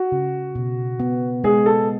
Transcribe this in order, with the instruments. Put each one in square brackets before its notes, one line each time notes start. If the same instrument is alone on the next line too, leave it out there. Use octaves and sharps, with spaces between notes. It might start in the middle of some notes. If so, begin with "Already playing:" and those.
Already playing: [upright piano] F#4
[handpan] C#3
B2
B3
[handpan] G#3 [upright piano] G#4
[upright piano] A4